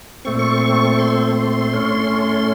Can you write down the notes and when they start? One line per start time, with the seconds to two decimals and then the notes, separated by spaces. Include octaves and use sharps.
0.25 A#2 A3 C4 C#6
0.39 C#6
0.99 C6
1.74 A2 A3 C#4